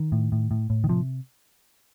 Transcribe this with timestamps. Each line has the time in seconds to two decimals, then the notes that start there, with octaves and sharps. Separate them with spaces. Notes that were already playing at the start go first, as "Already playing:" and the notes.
Already playing: D#3
0.12 A2
0.32 A2
0.51 A2
0.70 A2
0.84 D#3
0.89 C3 F3